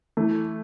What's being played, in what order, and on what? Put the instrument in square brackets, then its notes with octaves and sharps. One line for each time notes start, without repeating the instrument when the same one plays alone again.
[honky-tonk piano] E3 A3